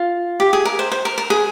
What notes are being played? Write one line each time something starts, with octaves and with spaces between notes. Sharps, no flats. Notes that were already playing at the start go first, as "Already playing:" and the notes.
Already playing: F4
G4
G#4
A#4
C5
C5
A#4
A#4
G#4